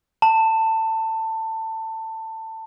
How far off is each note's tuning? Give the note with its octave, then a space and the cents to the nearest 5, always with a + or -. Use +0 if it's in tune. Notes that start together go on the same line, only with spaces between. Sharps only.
A5 +20